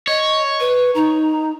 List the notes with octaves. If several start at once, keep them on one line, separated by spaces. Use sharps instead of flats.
C#5 D#5
B4
D#4 A#5